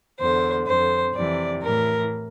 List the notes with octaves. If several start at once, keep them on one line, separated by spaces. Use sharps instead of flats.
E2 D3 C5
F2 D3 C5
F2 C3 E3 D5
A2 E3 A#4